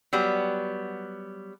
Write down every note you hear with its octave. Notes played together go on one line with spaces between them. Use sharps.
F#3 G3 B3